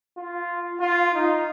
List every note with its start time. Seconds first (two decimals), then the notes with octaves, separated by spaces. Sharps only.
0.17 F4
0.80 F4
1.15 D#4